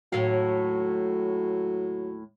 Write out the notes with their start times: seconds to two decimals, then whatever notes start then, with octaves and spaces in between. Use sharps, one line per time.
0.12 D#2 A2 F#3 F5